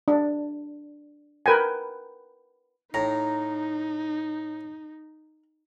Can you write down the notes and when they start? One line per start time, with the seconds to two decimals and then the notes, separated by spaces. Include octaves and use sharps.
0.08 D4
1.46 A#4 B4 G5 G#5
2.94 A2 D#4 A#5